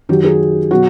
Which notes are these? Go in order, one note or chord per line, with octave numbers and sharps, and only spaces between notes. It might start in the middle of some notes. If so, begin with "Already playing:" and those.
F#2 D#3 F#3 G4
G#4
B2 F#3 F#4